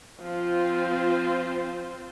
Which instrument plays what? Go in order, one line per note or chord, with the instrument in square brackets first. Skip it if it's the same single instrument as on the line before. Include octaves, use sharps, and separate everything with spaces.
[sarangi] F3 [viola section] C4 F4 C5